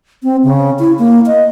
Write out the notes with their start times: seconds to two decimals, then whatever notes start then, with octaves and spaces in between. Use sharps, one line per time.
0.23 C4
0.44 C#3
0.79 E4
0.99 A#3
1.27 D#5